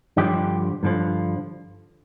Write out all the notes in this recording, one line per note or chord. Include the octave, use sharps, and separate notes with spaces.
G2 D3 F3 G4
G2 D3 F3